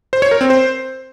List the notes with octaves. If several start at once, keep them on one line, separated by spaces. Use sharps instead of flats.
C5
C#5
A#4
C4
C5